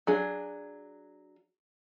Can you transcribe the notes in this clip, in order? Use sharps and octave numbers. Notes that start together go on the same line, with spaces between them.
F#3 D4 G#4